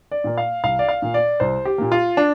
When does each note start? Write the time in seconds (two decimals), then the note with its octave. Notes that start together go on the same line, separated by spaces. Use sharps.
0.11 D5
0.24 A#2 A#3
0.38 F5
0.64 C2 F5
0.79 D5
0.89 F5
1.02 A#2 A#3
1.14 D5
1.40 C2 C5
1.65 G4
1.78 A#2 A#3
1.92 F4
2.17 D4